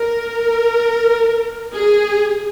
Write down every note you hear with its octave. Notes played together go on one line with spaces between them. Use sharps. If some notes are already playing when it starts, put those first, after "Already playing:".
Already playing: A#4
G#4